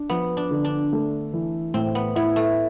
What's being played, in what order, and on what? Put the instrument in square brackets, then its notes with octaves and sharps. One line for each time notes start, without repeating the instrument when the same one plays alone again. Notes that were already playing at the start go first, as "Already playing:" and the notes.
Already playing: [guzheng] D4
[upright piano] F3 [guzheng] B3
[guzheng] D4
[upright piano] D3
[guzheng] D4
[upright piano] A3
E3
[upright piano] A2 [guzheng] C4
[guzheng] B3
[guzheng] B3 [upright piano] E4
[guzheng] A3